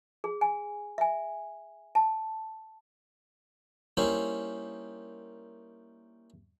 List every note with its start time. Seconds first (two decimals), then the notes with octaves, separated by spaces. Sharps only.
0.24 G#4
0.41 G#5
0.98 E5 G#5
1.95 A5
3.97 G3 A#3 C#4 D#4 E4 C5